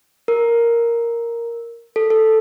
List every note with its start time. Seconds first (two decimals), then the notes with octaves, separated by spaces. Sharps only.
0.28 A#4
1.96 A4
2.10 A4